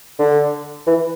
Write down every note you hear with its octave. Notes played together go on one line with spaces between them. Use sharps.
D3
E3